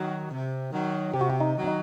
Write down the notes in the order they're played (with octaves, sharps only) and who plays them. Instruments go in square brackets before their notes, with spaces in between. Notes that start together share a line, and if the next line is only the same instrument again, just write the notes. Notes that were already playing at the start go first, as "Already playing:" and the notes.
Already playing: [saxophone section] D#3 F#3
C3
D#3 F#3
[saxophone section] C3 [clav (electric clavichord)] G4
[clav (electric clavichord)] F#4
G4
D#4
[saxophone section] D#3 F#3
[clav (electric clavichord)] D#4